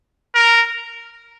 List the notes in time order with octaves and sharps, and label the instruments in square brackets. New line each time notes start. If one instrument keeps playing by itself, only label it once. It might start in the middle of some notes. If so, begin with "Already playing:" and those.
[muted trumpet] A#4